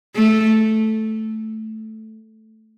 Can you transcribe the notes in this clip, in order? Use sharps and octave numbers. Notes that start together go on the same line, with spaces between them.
A3